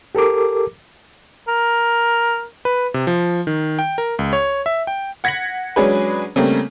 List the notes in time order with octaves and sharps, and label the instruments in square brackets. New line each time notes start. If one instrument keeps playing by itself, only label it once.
[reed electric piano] G4 A4 A#4 D6
[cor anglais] A#4
[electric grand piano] B4
C3
F3
D#3
G5
A#4
C#2
C#5
E5
G5
[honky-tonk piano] F#5 G#6 A#6 B6 C#7 F#7
F#3 G#3 C#4 D4 G#4 B4
C#3 G3 A3 A#3 C4